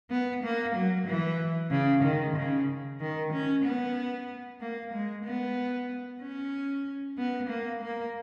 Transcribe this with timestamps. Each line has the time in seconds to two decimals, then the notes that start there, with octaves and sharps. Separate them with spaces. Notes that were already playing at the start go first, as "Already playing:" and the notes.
0.10 B3
0.43 A#3
0.75 F#3
1.06 E3
1.71 C#3
2.03 D#3
2.36 C#3
3.00 D#3
3.32 C#4
3.64 B3
4.60 A#3
4.93 G#3
5.25 B3
6.21 C#4
7.18 B3
7.49 A#3
7.82 A#3